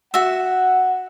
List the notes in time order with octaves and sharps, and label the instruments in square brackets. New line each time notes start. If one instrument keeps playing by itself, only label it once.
[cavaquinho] F#4 E5 [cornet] F#5